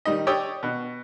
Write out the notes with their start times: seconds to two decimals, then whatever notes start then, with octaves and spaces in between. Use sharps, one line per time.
0.05 D#3 G3 D#4 D#5
0.27 G4 C#5 D5 G5 D#6 E6
0.63 B2